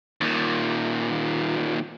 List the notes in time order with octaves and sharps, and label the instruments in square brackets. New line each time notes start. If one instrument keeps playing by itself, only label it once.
[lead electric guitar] D#2 A#2